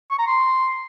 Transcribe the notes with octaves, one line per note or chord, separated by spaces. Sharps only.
C#6
A#5
C6